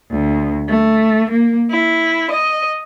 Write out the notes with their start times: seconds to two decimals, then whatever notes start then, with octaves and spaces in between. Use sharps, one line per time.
0.11 D2
0.69 A3
1.31 A#3
1.70 E4
2.31 D#5